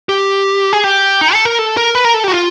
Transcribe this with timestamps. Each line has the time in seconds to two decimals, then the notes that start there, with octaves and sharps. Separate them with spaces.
0.09 G4
0.73 G#4
0.84 G4
1.21 D#4
1.34 A4
1.45 A#4
1.59 A4
1.77 A#4
1.95 B4
2.05 A#4
2.14 A4
2.24 F#4 G4
2.33 F4